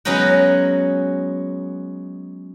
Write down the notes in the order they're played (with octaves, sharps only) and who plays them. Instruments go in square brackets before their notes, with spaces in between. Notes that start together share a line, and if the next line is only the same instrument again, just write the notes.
[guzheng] F#3 G#3 B3 C#4 D#4 F#4